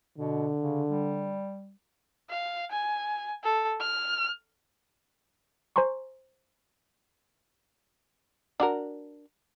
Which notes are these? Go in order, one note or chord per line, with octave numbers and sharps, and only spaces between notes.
B2 D3
C#3
G3
F5
G#5
A4
F6
C5 G#5 A#5 C6 C#6
D4 F#4 A#4